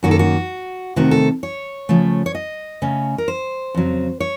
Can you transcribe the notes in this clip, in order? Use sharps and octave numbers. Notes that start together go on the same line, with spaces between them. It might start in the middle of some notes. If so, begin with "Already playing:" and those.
F#2 D#3 A#3 F#4
A4
F#4
C3 D#3 A3 F#4
A4
C#5
C#3 F3 A3
C#5
D#5
C#3 A3 C#4
A#4
C5
F2 C#3 F#3
C#5